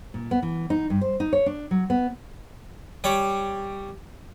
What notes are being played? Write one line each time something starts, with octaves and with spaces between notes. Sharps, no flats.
A#2
B3
E3
D#4
G2
C5
D#4
C#5
D4
F#3
B3
G3 C#5 D6